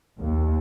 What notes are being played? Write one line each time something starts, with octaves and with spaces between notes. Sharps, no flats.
D#2